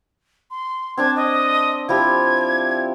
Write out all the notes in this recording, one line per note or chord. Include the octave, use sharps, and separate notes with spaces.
C6
C4 D4 A5 G#6
D#5
F3 E4 G4 G#6